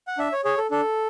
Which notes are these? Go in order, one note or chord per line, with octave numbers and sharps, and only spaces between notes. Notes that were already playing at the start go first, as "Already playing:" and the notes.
F#5
D4 E5
C#5
G#4 C#5
A4
D4 A4